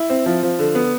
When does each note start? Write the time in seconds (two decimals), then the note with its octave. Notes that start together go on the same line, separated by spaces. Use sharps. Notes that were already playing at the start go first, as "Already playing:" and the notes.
Already playing: E4
0.10 C4
0.26 F3
0.43 F3
0.59 D3
0.75 B3